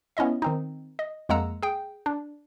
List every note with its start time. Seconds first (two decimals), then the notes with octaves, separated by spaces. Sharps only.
0.17 B3 C#4 E4 D#5 E5
0.42 D#3 C4 D#4
0.99 D#5
1.29 F2 G#3 A#3 F#5 A#5 E6
1.62 G#4 G5
2.06 D4